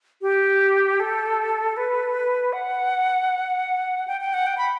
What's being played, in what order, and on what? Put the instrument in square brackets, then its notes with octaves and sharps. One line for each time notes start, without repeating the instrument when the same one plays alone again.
[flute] G4
A4
B4
F#5
G5
G5
F#5
G5
B5